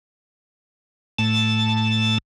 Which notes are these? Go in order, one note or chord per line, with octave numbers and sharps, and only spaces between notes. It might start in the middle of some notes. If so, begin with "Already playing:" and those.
A2 A3 A5